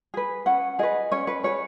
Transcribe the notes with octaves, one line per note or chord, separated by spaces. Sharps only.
G#4 B4
C#4 F#5
G#4 B4 D#5
C#4 C#5
B4
G#4 B4 C#5